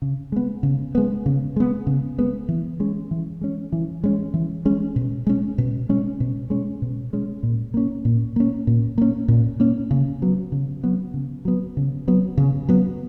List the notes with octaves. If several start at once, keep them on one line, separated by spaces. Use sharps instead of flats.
C#3
G#3 B3
C#3
G#3 B3
C#3
G#3 B3
C#3
G#3 B3
E3
G#3 C#4
E3
G#3 C#4
E3
G#3 C#4
E3
G#3 C#4
B2
G#3 C#4
B2
G#3 C#4
B2
G#3 C#4
B2
G#3 C#4
A#2
A#3 C#4
A#2
A#3 C#4
A#2
A#3 C#4
A#2
A#3 C#4
C#3
F#3 B3
C#3
F#3 B3
C#3
F#3 B3
C#3
F#3 B3
C#3
F#3 B3